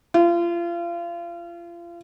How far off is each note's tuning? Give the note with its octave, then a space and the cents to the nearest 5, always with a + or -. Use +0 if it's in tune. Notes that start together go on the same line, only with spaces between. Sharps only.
F4 -30